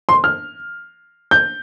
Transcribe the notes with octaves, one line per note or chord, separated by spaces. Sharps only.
C6
F6
G6